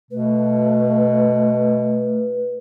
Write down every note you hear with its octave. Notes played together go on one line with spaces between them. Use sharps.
B2 A3 B4